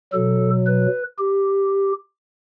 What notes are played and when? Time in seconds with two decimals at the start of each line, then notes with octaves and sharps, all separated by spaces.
0.13 B2 F#3 A4
0.66 B4
1.19 G4